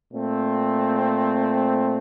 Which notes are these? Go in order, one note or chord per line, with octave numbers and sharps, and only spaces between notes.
A#2 A3 C4